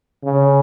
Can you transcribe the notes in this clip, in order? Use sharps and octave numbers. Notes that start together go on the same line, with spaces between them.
C#3